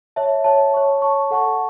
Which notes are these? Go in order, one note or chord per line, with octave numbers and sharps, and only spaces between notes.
C#5 E5 A5
C#5 E5 A5
C#5 A5 C#6
C#5 A5 C#6
A4 F#5 A5 C#6